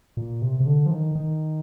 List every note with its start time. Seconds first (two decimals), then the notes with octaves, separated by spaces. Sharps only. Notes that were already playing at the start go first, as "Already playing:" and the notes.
0.17 A#2
0.42 C3
0.60 C3
0.66 D3
0.86 F3
0.91 D#3
1.15 D#3